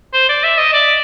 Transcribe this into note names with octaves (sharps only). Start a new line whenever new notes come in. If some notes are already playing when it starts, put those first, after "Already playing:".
C5
D5
E5
D#5
D5